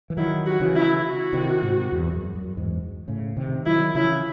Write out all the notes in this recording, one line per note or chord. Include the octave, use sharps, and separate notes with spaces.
E3
D#3 F#3 E4
F#4
C#3 E3
E4
F#4
C3 D#3
G#2 C3
E2
F#2
F#2
E2 G#2
A2 C#3
C3 D#3
D#3 F#3 E4
C#3 E3 E4